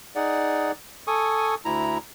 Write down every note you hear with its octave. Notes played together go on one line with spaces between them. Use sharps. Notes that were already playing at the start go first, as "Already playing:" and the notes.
D#4 G#4 D5 F#5
A4 G#5 C#6 D#6
D2 E4 A#5